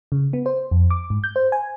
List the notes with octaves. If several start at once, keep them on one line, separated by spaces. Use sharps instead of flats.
C#3
B3
C5
F2
D6
G#2
G6
C5
G#5